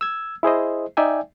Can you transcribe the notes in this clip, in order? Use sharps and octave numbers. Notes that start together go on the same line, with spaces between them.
E6 G#6
E4 G#4 C5 D#5
D#4 D5 E5 G5 G#5